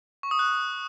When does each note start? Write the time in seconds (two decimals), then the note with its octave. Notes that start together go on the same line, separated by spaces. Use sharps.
0.23 C#6
0.31 D#6
0.39 F#6